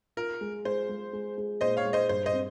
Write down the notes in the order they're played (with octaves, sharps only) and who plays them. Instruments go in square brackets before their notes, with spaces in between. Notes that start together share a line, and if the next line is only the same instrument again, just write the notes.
[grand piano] F4 [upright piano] A#4
[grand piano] G#3
[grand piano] G#3 [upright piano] C5
[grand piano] G#3
G#3
G#3
[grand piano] A#2 [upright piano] C5 D#5
[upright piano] C#5 F5
[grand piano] G#3
[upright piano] C5 D#5
[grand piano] G2 [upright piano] C5
[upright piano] C5 D#5
[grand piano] C4